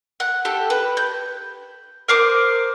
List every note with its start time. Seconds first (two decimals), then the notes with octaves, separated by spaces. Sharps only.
0.20 F#5
0.45 G4 A4
0.70 B4
0.97 G6
2.08 A#4 C5 D6 D#6